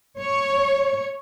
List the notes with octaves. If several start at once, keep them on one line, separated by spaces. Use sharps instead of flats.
C#5